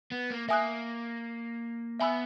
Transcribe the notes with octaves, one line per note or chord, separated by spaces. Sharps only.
B3
A#3
A#3 E5 G#5 D#6 F#6
B3 E5 G#5 B5 E6